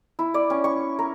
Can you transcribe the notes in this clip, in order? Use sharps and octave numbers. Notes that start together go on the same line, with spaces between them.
E4
D5
C#4
C#6
A#4